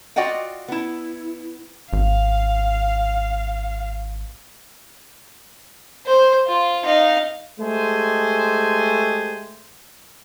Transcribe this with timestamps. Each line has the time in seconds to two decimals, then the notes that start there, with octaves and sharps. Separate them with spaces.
0.16 F4 F#4 D5 D#5 F#5 G5
0.68 B3 E4
1.93 G#1 F5
6.06 C5
6.47 F4
6.85 D#4 F5
7.60 G#3 A3 G4 C5 G#5